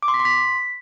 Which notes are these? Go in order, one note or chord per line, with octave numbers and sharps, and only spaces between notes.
D6
C6
B6
C6
B6